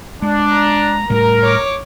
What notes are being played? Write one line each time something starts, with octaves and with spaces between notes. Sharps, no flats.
G#3 D4
A#5
A2 G3 A#4
C#5 D6